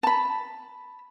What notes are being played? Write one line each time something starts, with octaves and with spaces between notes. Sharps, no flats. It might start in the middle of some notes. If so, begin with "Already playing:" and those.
A5 B5